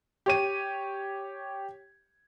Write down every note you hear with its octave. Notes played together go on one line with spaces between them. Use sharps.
G4 C#5 D#7